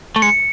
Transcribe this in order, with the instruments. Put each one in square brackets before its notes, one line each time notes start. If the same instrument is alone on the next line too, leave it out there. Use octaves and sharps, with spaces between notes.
[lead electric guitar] A3
[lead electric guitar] G#3 [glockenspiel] C#7